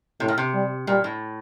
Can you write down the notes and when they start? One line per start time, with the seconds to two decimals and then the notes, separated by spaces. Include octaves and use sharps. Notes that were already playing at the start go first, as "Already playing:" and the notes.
0.20 A2 C3
0.28 A#2
0.38 C3
0.54 G3
0.87 A#2 G3
1.04 A2